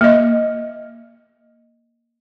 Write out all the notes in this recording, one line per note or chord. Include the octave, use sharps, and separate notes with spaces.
A#3 D#5